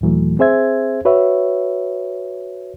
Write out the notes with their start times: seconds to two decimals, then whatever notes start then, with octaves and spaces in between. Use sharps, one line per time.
0.01 D#2 A#2 E3 F#3 A3
0.39 C4 G#4 C5 E5 G#6
1.05 F#4 B4 C#5 E5